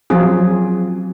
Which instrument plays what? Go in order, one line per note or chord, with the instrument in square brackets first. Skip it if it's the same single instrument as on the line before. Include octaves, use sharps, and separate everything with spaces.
[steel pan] F3 F#3 C4 F4 G#4